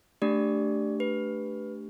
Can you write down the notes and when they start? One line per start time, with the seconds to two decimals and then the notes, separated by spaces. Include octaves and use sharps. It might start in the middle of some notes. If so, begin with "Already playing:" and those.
0.22 A3 D4 G4 D5
1.00 B4